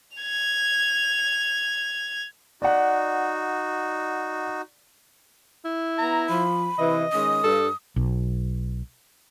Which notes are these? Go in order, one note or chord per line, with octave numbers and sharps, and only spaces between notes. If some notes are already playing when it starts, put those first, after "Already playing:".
G#6 F7
D#4 F#4 D5 F#5
E4
B3 A#5
F3 B5
C3 E3 D#5
D#3 G#3 C#4 D#6
G2 A4
B1